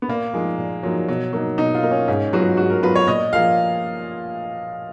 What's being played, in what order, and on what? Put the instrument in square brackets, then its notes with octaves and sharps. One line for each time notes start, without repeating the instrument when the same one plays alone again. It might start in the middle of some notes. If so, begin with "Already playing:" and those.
[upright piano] B3
[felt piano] A#2 [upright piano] A#3
[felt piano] F3 A#3 D#4 [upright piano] G#3
[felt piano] A#2
[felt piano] F3 A#3 D#4 [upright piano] F#3
[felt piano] B2 [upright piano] F#3
[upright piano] F#3 [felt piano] A#3 D#4
[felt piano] B2 [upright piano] D#4
[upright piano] F4
[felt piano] A#3 D#4
[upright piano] C#4
[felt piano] G#2 [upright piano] C#4
[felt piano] F#3 B3 F4 [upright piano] F#4
[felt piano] G#2 [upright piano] F#4
[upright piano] A#4
[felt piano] F#3 B3 F4 [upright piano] B4
[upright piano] C#5
[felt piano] A#2 [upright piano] D#5
[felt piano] F3 A#3 F4 G#4 [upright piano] F5